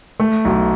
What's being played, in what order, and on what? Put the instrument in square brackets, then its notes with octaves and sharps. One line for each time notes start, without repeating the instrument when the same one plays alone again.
[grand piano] A3
B1